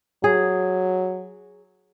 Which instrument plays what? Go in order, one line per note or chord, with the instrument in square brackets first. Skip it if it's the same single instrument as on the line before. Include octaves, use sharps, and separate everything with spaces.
[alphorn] F#3 [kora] G#4